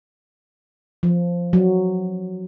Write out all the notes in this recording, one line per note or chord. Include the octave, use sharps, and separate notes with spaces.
F3
F#3